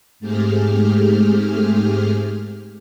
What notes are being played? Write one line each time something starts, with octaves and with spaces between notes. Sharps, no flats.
G#2 A3 C4 G4 G#4 F6